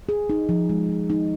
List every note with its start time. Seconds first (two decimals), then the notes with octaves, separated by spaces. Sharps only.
0.09 G#4
0.30 D#4
0.49 F3
0.70 G#3
0.89 F3
1.10 D#4